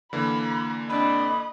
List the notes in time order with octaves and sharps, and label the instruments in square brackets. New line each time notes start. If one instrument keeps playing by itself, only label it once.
[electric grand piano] D3 E3 A#3 [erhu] B5
[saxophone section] C4 D4 [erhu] D#5 [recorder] B5